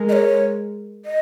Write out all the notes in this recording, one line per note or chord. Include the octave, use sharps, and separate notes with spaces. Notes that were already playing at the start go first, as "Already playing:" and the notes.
Already playing: G#3 A#4
D#5
C#5
D#5